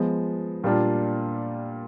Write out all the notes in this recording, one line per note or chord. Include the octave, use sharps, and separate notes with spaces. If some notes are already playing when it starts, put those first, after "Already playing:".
Already playing: F3 G#3 B3
A#2 G3 A#3 D4 F4